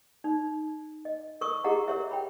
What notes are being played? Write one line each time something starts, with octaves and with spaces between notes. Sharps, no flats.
D#4
D#5
A#4 C#6 D#6 E6
E4 G4 G#4 D#5 F#5 A#5
A#4 C#5 E5
G5 B5